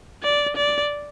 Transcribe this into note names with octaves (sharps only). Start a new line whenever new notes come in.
D5
D5